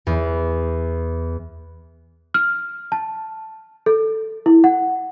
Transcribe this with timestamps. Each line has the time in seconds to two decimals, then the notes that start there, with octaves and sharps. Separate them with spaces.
0.07 E2
2.34 F6
2.92 A5
3.86 A4
4.46 E4
4.64 F#5